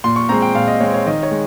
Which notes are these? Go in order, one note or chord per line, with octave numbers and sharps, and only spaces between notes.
A#2 C6
C#6
G#3 C4 A#5
G5
A#2 F5
D#5
G#3 C4 C#5
C#5
D#3 D#5
C#5
G#3